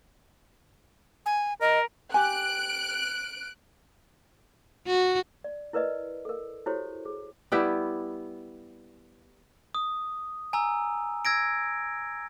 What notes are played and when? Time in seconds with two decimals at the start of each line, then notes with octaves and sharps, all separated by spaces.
1.26 G#5
1.61 A#4 D#5
2.14 G4 G#5 F#6 D7
4.88 F#4
5.44 D5
5.73 E4 A#4 B4 D5 D#5
6.25 A4 A#4
6.66 E4 F#4 G4 A4 C5 C#5
7.05 G#4
7.52 G3 B3 E4 G4
9.75 D#6
10.53 G#5 A#5 E6
11.25 E6 G#6 A#6 D7